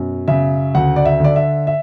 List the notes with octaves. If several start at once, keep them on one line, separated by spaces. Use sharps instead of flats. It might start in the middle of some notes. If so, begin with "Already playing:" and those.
Already playing: F#2 B2
C#3 E5
D2 F#5
D5
E5
D3 D5
E5
E5